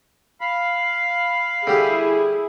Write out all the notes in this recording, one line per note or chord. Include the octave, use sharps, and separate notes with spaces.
F5 B5
D3 G3 E4 G4 G#4